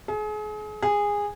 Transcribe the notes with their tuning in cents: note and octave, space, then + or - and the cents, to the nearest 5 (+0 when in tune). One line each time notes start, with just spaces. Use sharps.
G#4 +35
G#4 -15